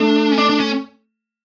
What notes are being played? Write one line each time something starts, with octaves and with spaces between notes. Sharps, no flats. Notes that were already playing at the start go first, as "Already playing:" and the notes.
Already playing: A3 D4
C#4
D4
D4
C#4